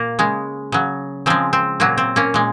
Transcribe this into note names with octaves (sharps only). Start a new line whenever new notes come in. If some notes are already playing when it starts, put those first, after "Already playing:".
Already playing: A#2 A#3
C#3 G#3
C#3 F#3
C#3 F3 G#3 C4
C4
A#2 F#3 A#3
C4
A#3 C#4
A#2 G#3